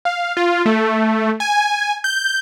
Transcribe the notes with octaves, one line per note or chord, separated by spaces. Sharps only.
F5
F4
A3
G#5
G6